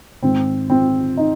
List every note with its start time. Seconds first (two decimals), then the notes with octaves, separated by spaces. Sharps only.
0.23 G#2 D#3 C4
0.70 C4
1.17 D#4